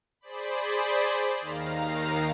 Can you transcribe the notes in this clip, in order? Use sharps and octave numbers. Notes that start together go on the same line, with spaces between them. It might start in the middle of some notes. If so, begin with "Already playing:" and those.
G#4 C5 D5 B5
D#2 D#3 F5 A#5